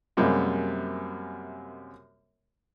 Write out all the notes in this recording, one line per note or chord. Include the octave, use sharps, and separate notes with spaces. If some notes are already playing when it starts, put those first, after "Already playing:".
F#2 C3 G3 G#3 A#3